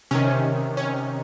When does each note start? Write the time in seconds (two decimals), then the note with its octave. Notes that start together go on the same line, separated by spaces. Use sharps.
0.11 C3 D#3 C#4
0.77 C#4